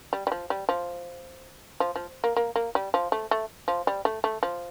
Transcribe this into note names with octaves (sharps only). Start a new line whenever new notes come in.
G3
G3
F3
G3
F3
F3
F3
A#3
A#3
A#3
G3
F3
A3
A3
F3
G3
A3
A3
F3